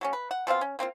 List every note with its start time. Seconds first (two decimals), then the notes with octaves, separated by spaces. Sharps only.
0.01 F#3 A3 C#4
0.13 B4
0.31 F#5
0.47 B2 C4 F4 F5
0.61 C#4
0.79 A#3 C4 C#4 F4